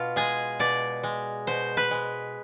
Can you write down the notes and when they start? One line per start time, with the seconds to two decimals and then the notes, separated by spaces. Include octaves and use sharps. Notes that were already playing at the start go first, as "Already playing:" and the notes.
Already playing: B2 F4
0.16 G#3 G#4
0.60 B2 D5
1.04 G#3
1.47 B2 C5
1.77 B4
1.91 G#3